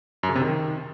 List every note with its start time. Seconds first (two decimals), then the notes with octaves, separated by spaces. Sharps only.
0.23 F#2
0.29 C#3
0.35 C3
0.41 D#3